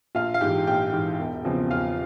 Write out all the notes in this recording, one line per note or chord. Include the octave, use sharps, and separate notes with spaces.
A#1 F4 F5
F5
G#2 E3 G4 G5
A#1 G4 G5
G#2 E3
E1
E2 C#3 F3 C4
E1 F4 F5